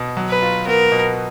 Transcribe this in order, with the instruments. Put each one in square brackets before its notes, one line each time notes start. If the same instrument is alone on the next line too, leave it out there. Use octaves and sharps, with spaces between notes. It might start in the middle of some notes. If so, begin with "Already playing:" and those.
Already playing: [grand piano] B2
F#3
[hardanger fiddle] B4
[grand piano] F4
[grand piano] B3 [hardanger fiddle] A#4
[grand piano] B2